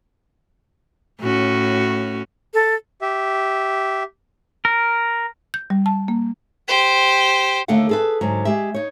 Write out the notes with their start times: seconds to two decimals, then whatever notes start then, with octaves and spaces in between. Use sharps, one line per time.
1.20 A2 C#4 F#4
2.54 A4
3.02 G4 E5
4.65 A#4
5.54 G6
5.70 G3
5.86 A5
6.08 A#3
6.68 G4 C5
7.68 D#2 D3 A3 A4 F5 F#5
7.89 G#4 A4 B4
8.21 G#2 D3 F#3
8.45 G#3 G4 E5
8.74 D#4 C#5